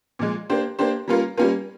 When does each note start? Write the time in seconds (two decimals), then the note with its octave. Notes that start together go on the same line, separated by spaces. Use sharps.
0.19 A#2 F3 G#3
0.50 A#3 D4 G4 C5
0.79 A#3 D4 G4 C5
1.08 G3 A#3 C#4 F4 A#4
1.37 G3 A#3 C#4 F4 A#4